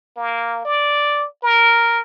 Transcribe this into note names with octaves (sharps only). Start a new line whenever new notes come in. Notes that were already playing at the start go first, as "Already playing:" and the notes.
A#3
D5
A#4